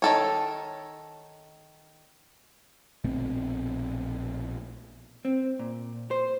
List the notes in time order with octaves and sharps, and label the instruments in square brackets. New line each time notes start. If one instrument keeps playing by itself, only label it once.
[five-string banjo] D#3 A4 C#5
[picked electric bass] A#1 B2 A3 C4
[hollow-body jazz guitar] C4
A#2
C5